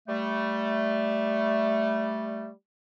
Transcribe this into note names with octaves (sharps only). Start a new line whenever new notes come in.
G3 A3